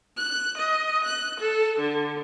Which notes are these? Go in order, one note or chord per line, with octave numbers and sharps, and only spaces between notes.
F#6
D#5
F#6
A4
D3